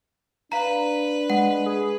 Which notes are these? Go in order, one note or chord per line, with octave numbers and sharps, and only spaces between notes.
D4 B4 F5 A#5
G#3 F#5
G#4